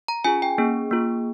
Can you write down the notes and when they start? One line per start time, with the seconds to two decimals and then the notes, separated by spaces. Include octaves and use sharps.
0.08 A#5
0.24 C#4 F4 G#4 G#5
0.42 G5
0.58 A#3 C#4 G#4
0.91 A#3 F4 G#4